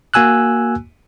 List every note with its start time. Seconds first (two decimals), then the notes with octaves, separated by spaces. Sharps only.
0.14 A#3 F#4 G#5 E6 F#6